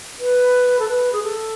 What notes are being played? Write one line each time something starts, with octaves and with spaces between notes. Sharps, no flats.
B4
A4
B4
G#4
A4